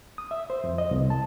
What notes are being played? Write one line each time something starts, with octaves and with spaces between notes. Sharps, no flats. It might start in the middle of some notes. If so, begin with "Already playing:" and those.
D#6
E5
C5
F2
D#5
C2
A5